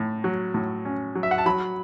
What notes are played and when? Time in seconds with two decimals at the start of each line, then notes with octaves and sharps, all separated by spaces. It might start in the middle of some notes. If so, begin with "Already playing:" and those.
Already playing: A2
0.24 F#3
0.54 A2
0.85 C#4
1.15 F#3
1.23 E5
1.31 F#5
1.38 A5
1.46 F#3 B5